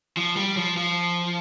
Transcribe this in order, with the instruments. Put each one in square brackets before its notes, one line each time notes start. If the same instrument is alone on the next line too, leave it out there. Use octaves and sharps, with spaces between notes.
[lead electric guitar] F3
G3
F3
F3